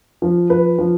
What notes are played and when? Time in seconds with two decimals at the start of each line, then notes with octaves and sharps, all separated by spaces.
0.22 F3
0.50 F3 B4
0.78 F3